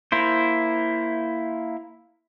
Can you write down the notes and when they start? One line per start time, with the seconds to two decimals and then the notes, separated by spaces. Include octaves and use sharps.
0.12 A#3 E4 C5